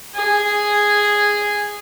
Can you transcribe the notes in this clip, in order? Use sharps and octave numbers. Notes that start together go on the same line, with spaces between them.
G#4